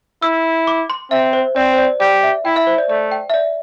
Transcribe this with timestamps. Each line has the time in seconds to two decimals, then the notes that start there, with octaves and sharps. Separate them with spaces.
0.22 E4 E6
0.67 D6
0.90 C6
1.11 C4 E5
1.33 C5
1.56 C4 D5
1.73 C5
1.78 D5
2.00 G4 D5
2.23 E5
2.45 E4 G5
2.56 E5
2.67 C5
2.78 D5
2.89 A3 D5
3.12 G5
3.30 E5
3.34 D5